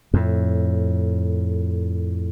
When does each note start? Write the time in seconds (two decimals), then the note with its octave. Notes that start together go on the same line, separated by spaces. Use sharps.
0.14 F2 A2